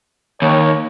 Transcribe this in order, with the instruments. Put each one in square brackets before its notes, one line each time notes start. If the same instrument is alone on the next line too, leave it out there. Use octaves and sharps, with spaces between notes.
[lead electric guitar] D#2 [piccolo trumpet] C#5